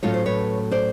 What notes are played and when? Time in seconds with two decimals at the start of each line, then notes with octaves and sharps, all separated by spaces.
0.03 A2 F#3 A3 C#4 F4 C#5
0.14 C5
0.26 B4 C#5
0.71 C5 D5